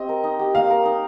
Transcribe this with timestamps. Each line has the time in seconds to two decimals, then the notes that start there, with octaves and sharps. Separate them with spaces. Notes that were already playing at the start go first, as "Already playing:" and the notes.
Already playing: C4 G4 D#5
0.09 A#4
0.24 D#4
0.39 G4
0.55 A#3 F5
0.70 A#4
0.85 D#4